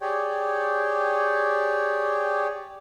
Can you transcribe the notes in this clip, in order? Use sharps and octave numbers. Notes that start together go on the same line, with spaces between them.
G4 G#4 C#5 D5 G5